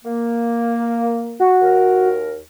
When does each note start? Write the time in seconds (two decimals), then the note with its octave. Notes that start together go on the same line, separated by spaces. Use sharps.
0.05 A#3
1.40 F#4
1.61 D#2 A#4